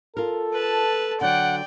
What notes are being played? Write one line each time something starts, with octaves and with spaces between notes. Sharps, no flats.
F4 A4 A#4
B4 A5
D3 F#3 D5 F#5 G5